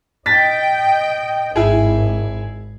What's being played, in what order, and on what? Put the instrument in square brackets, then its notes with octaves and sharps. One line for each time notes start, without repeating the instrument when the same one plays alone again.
[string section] D#5 G5 [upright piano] A6 B6
[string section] G#1 [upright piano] E4 G#4